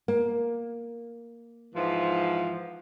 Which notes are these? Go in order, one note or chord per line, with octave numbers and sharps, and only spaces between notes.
A#3
G#2 E3 F3